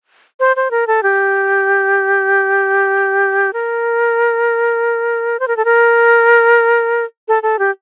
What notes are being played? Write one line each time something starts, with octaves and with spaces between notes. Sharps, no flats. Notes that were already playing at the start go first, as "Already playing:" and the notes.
C5
C5
A#4
A4
G4
A#4
C5
A#4
A4
A#4
A4
A4
G4